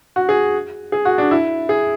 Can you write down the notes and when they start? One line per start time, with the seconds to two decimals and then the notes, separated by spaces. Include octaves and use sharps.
0.16 F#4
0.29 G#4
0.92 G#4
1.05 F#4
1.18 D4
1.31 E4
1.69 G#4